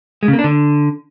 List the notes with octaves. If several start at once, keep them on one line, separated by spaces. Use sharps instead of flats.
G#3
C#3
A#3
D4
D3